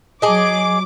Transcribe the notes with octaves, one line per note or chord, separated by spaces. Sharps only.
F#3 G#4 D#5 D6